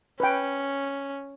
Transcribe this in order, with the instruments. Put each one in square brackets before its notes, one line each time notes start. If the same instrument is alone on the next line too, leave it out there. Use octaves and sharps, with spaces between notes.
[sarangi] C#4 [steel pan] B4 G5